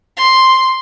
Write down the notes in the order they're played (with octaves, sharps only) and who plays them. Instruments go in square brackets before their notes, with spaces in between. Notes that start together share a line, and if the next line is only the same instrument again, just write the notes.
[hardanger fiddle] C6